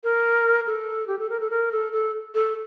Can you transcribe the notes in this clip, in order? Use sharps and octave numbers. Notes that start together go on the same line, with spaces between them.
A#4
A4
G4
A4
A#4
A4
A#4
A4
A4
A4